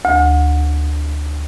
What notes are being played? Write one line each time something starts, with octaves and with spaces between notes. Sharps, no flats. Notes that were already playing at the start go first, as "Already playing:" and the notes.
D2